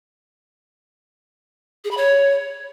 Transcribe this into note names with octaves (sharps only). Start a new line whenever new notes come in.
G#4
B5
C#5